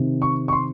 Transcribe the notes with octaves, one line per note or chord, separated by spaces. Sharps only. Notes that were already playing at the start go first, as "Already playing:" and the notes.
Already playing: C3 D#3
C#6
C#6
C6